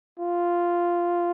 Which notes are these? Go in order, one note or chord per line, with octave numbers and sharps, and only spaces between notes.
F4